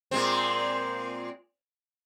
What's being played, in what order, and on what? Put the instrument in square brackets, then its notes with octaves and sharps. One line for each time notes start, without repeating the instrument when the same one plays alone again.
[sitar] A#2 G#3 C4